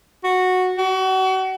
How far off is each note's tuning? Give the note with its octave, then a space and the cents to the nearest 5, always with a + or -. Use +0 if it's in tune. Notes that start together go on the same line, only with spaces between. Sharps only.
F#4 -10
F#4 +35